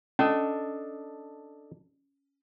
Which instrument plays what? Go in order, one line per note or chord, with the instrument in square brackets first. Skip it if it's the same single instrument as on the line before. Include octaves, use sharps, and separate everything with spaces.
[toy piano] C#4 [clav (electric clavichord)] D4 A4 D#5